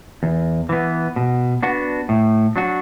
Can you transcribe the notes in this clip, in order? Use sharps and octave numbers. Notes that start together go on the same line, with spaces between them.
E2
E3 B3
B2
B3 D4 F#4
A2
F#3 D4 F#4